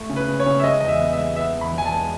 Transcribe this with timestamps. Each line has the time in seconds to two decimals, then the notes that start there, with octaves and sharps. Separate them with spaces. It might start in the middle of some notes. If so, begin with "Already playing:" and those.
Already playing: A3
0.09 C#3
0.16 B4
0.28 C#3
0.40 C#5
0.46 C#3
0.60 E5
0.64 G#3 D#5
0.81 E2 D#5
0.88 E5
1.00 B3
1.13 E5
1.19 G#3
1.36 B3 E5
1.55 E2
1.61 B5
1.73 E2 G#5
1.85 A5
1.91 G#3